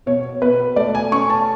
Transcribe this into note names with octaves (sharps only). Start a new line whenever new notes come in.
B2 C#5
B2 B4
A3 D5
G#5
C#4 C#6
A5